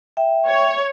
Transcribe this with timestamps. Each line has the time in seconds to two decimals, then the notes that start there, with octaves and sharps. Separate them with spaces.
0.17 E5 G5
0.47 C#5